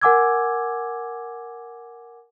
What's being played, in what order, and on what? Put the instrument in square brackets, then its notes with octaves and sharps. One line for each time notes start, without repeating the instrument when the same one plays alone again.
[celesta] A#4 F#5 G#5 D6 E6 G#6